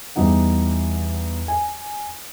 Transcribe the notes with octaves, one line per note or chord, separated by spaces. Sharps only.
E2 G3 D#4 F#5
G#5